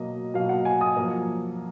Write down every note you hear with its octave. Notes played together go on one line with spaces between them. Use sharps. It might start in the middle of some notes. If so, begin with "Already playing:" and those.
Already playing: B2 F#3 A#3 D#5
B2 F#3 A#3 F5
F#5
G#5
D#6
F#2 F3 A#3